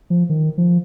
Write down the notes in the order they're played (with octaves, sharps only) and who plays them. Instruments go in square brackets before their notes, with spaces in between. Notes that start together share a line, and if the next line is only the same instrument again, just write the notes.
[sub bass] F3
D#3
F3